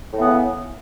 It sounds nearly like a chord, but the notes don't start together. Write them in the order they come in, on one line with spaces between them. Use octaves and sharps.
A2 E3 B3 C#3